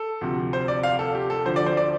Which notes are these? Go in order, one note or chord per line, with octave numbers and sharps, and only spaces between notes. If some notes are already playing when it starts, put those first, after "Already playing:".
Already playing: A4
D2 C3 F3
C5
D5
F5
A4
G4
A4
D2 D3 F3 C5
D5
C5
D5